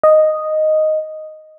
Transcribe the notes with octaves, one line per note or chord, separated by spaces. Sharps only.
D#5